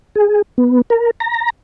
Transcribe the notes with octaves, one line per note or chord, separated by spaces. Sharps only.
G#4
B3
A#4
A#5